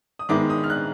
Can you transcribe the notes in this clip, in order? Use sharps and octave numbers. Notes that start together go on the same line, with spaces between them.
D#6
G#2 D#3 G#3 B3 E4 D6
D#6
F6
F#6